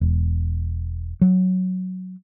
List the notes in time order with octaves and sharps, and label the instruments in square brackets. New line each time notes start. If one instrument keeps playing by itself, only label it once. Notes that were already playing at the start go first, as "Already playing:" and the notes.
[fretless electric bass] E1
F#3